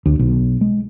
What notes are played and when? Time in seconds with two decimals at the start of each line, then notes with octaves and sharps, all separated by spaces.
0.06 D2
0.19 B1
0.61 G#3